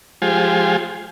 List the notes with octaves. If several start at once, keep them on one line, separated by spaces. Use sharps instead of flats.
F3 G#3 F4 G4 C5 G#5